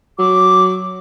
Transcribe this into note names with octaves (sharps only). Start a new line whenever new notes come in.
F#3 D6